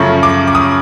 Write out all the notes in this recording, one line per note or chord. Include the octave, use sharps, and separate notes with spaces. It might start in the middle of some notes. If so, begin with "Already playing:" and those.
Already playing: F#2 C#3 F3 A3 C#6
D6
D6
D#6